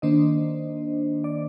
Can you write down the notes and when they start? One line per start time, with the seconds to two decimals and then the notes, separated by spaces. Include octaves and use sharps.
0.02 D#3 A#3 D4 C5 D#5
1.24 D5